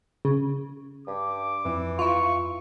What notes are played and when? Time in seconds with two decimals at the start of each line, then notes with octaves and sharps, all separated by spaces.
0.25 C#3
1.08 G2 D6
1.65 F2 E3
1.99 E4 F4 C#6